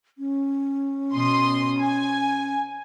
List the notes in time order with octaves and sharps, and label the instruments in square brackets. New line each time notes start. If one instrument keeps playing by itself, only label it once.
[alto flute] C#4
[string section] B2 C6 D#6
G#5